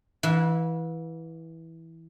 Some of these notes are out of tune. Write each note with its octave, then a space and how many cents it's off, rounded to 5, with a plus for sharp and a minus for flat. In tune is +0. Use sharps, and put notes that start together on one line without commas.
E3 -10 F5 +40 B5 -30